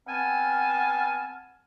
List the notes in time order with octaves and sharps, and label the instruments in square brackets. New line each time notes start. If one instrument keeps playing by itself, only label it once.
[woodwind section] B3 C4 G#5 A5 F6